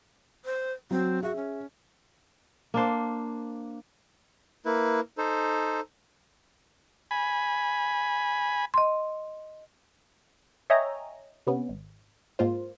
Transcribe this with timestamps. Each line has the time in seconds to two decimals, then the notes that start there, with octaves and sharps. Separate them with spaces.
0.45 C5
0.91 F#3 C4
1.23 F#4 G#4 E5
1.36 C#4
2.74 A#3 D4 C5
4.66 A#3 E4 B4
5.18 D#4 A4 C5
7.11 G#5 B5
8.74 D#5 C6
10.70 C#5 D#5 E5 G5 G#5 A#5
11.47 C3 B3 C#4
11.69 G#1
12.39 G#2 A#3 F4 C5